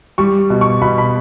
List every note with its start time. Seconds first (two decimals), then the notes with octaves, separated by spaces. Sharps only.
0.18 G3 C#6
0.50 B2
0.61 C#6
0.82 B2 B5
0.98 B5